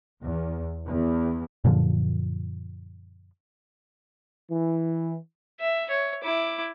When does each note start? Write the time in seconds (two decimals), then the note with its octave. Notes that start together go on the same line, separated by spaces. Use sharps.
0.23 E2
0.86 E2
1.64 F#2 A#2 D3 F3
4.50 E3
5.60 E5
5.90 C#5
6.23 E4 D6